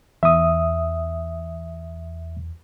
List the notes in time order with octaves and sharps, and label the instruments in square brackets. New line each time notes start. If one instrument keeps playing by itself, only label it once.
[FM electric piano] E2 [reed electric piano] E5 D#6